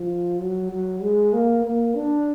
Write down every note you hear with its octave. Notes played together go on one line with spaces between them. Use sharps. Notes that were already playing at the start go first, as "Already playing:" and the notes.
Already playing: F3
F#3
F#3
G#3
A#3
A#3
D4